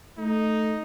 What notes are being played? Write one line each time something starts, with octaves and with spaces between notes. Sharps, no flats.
A3 D#4